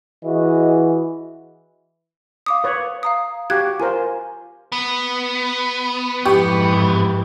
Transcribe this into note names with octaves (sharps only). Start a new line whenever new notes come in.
E3 F#4 G#4 D#5
F5 D6 D#6
B4 C#5
F5 A#5 D#6
F#4 G4 F5 F#6 G#6
F4 A#4 C5 G#5
B3
F2 G#2 E3 G4 C#6